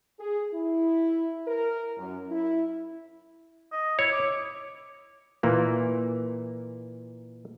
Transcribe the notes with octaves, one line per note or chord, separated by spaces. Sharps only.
G#4
E4
A#4
F#2
E4
D#5
E4 C#5
D6
A#2 E3 A#3